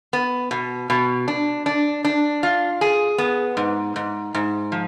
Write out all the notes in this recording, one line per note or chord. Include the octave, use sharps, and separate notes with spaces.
B3
B2
B2
D4
D4
D4
F4
G#4
B3
G#2
G#2
G#2
F3